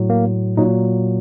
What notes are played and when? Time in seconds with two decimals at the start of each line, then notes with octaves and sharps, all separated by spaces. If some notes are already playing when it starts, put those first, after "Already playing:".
Already playing: A2 F#3
0.10 A#3
0.57 A#2 F#3 D#4